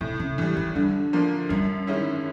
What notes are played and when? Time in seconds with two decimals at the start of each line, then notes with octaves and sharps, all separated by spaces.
0.01 A2 C3
0.20 C#3
0.38 D3 E3
0.42 G3
0.57 D#3
0.75 D3 G3
1.13 F3 A#3 D4
1.49 F#2 G3
1.87 D#3 G#3 C#4 E4